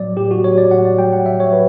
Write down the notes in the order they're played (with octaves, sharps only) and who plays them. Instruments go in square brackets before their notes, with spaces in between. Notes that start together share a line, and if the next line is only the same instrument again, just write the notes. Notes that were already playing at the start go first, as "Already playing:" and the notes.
Already playing: [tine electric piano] A2 F#3 D5
A2 G4
F#4
F#3 C#5
D5
A2 F#5
D5
F#3 G5
F#5
A2 E5
C#5
F#3 B4